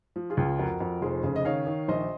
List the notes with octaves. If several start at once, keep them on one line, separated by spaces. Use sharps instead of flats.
F3
F4 G#4
C#2
F2 F#4 A#4
F2
F1 G#4 C5
C#3
D#5
D#3 C#5 F5
D#3
A#1 C5 D#5